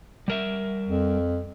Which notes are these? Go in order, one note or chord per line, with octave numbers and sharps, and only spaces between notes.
G3 A#4 E5
F2